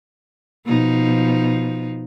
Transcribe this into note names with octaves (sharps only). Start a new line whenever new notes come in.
B2 F3 D#4